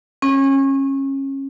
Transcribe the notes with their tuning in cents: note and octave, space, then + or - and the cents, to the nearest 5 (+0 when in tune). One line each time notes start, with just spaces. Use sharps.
C#4 -25